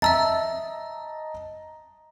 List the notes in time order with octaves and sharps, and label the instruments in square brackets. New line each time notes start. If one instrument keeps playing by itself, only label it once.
[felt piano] D#5 A5 A#5 [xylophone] E5 E6 A6